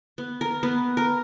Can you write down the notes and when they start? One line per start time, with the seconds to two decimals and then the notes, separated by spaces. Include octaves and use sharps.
0.18 B3
0.41 A#4
0.63 B3
0.97 A#4